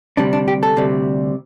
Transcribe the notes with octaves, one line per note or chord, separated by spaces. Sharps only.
D2 C3 G3 D4
D4
G4
A4
D2 C3 G3